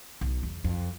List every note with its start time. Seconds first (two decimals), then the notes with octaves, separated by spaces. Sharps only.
0.21 B1
0.43 E2
0.64 F2